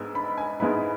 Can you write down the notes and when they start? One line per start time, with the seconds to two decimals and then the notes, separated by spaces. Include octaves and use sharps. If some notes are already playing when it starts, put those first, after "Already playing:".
Already playing: G#2 G#3 B3 E6
0.15 B5
0.38 G#5
0.60 G#2 G#3 B3 E4 B5